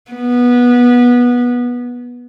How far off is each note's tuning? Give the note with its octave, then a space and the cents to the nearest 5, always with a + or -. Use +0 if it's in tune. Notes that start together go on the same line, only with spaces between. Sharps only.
B3 -15